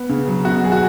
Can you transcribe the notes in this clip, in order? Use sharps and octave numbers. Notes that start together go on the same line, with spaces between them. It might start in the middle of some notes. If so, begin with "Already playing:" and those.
Already playing: B3
C#3
F#3
B2 F#4
F#3 G#4
F#4